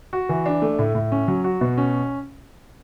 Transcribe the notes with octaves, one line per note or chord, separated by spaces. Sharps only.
F#4
E3
D4
A3
A2
A2
C#4
F#3
F#4
B2
C#4